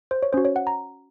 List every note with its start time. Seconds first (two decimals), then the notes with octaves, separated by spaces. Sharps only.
0.11 C5
0.23 C#5
0.33 C#4 F#4 C5
0.45 C#5
0.56 F#5
0.67 A#5